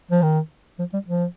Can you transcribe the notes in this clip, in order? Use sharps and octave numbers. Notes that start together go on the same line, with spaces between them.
F3
D#3
F3
G3
F3